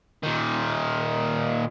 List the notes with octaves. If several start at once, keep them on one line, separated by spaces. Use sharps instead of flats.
A#2 D#3